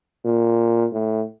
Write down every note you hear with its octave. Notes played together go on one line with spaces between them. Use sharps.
A#2
A2